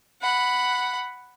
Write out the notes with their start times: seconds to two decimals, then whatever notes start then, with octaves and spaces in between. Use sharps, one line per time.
0.22 F#5 B5